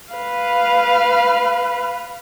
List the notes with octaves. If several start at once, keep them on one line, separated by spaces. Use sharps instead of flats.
B4 F5